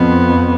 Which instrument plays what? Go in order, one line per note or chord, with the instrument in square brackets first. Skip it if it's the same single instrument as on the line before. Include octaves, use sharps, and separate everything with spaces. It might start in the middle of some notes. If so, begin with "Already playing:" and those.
Already playing: [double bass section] F2 [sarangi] B3